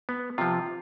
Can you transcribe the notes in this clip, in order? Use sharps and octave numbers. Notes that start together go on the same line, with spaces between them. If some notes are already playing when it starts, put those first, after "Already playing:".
B3
C3 F3 F4